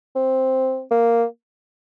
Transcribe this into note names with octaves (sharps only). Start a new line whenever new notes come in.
C4
A#3